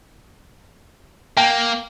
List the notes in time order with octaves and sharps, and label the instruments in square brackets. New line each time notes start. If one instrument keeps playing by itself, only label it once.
[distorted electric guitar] A#3 [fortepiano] G5